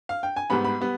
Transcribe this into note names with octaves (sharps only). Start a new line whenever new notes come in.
F5
G5
G#5
G#2 G3 B3 B5
B5
G3 B3